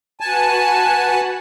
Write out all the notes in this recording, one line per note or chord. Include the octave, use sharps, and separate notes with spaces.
F#4 B4 F#5 G#5 A5